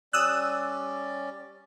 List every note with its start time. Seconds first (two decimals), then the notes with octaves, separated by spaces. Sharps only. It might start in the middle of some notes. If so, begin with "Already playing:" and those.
0.13 G3 C#4 D5 D#6 E6 F#6